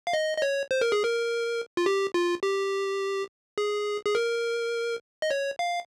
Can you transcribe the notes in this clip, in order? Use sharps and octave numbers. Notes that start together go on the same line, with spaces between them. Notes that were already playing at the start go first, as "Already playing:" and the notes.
F5
D#5
D#5
C#5
C5
A#4
G#4
A#4
F4
G4
F4
G4
G#4
G#4
A#4
D#5
C#5
F5